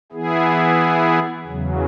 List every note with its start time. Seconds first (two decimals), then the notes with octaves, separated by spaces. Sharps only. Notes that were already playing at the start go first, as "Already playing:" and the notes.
0.12 E3 B3 E4 G#4
1.47 E2 C#3 F#3